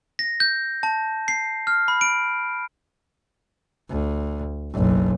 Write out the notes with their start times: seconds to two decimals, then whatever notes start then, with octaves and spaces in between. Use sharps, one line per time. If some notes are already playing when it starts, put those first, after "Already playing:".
0.19 A#6
0.40 G6
0.83 A5
1.28 C7
1.67 F6
1.88 B5
2.01 D7
3.90 D2
4.72 F#1 B1